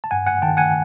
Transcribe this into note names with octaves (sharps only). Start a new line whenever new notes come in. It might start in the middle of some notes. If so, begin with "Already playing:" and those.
A5
G2 F#5 G#5
F#5 G#5
D#3 G5 A5
F#5 G#5